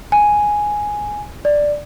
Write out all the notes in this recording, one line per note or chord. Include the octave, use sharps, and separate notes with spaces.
G#5
D5